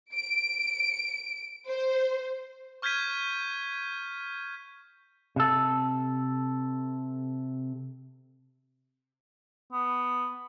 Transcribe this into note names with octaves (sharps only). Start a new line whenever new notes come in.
D7
C5
C#6 F6 G6 G#6 B6 D#7
C3 A4
B3